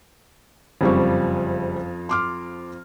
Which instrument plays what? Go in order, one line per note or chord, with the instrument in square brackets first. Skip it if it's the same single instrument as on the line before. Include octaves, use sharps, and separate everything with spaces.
[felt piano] F#1 G3 C#6 [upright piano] F2 F3
[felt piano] C6 D6 F6